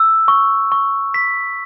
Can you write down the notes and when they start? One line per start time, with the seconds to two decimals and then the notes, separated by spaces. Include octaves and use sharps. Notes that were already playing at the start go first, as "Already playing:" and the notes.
Already playing: E6
0.28 C#6
0.72 C#6
1.14 B6